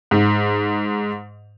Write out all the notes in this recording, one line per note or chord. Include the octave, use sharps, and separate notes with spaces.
G#2